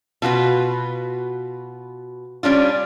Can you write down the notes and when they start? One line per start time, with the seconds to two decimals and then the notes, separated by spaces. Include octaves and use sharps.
0.22 B2 F4 F#4 B4
2.43 G3 C#4 D4 F4